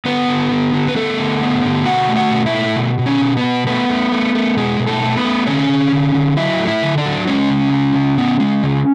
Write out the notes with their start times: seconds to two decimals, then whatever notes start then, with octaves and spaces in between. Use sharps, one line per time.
0.05 D3 B3 B4
0.28 D3
0.51 D3
0.73 D3
0.88 B4
0.95 A3 B3 A4
1.19 D3
1.41 B3
1.64 D3
1.86 B2 F#4 F#5
2.09 A3
2.16 F#4 F#5
2.31 B2
2.46 E4 E5
2.54 A3
2.76 B2
2.99 B2
3.06 C#4 C#5
3.21 B2
3.37 B3 B4
3.44 B2
3.67 A3 B3 B4
3.89 A3
4.12 A3
4.35 A3
4.57 B2 G#3 G#4
4.80 B2
4.87 A3 A4
5.02 A3
5.17 B3 B4
5.25 A3
5.47 D3 C#4 C#5
5.69 D3
5.92 D3
6.14 D3
6.37 F#3 E4 E5
6.60 A3
6.67 E4 E5
6.83 D3
6.98 D4 D5
7.05 F#3
7.27 G#3 C#4 C#5
7.50 C#3
7.73 G#3
7.95 C#3
8.18 B3
8.40 G#3
8.63 C#3